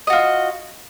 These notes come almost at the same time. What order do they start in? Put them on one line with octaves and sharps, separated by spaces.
D#5 F#4 F4